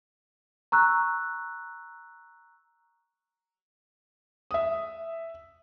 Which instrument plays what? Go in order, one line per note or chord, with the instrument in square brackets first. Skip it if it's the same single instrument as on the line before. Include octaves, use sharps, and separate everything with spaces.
[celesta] A#5 C#6 E6 F#6
[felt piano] E5 D#6